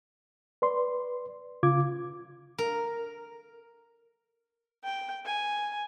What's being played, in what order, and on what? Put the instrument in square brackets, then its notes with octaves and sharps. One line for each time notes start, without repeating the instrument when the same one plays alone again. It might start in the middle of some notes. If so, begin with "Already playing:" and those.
[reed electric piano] B4 D5 C6
C#3 F4 D6 G#6
[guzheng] A#4
[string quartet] G5
G#5